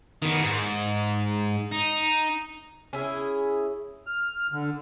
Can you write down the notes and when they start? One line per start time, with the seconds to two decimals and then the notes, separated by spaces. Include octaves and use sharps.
0.22 D#3 B3
0.42 G#2
1.72 D#4
2.93 C#4 E4 G#4
4.06 F6
4.52 D3